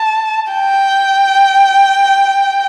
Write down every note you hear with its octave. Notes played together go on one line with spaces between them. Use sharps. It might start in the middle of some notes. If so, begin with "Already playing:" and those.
Already playing: A5
G5